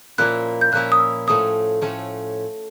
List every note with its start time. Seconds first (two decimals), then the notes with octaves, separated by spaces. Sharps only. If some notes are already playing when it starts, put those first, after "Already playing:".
0.18 A#2 F3 A#3 C#4 E4 F#6
0.61 G6
0.72 A#2 F3 A#3 C#4 E4 F#6
0.92 D#6
0.99 E6
1.27 A2 F3 A3 C#4 D#6
1.81 A2 F3 A3 C#4